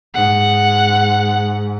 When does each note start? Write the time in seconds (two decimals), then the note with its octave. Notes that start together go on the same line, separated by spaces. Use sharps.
0.15 G#2 F#5